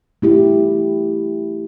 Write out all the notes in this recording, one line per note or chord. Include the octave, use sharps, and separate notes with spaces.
A3 E4 G4